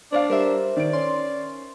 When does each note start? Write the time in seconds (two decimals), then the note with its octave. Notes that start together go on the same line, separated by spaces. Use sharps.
0.12 D4 C5 D5 F5
0.30 G3 A#4 C5 E5
0.77 D#3 D5 D7
0.93 C#4 C6